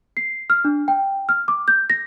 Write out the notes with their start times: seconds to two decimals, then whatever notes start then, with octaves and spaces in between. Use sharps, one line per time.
0.17 C7
0.50 F6
0.65 D4
0.88 G5
1.29 F6
1.48 D6
1.68 G6
1.90 A#6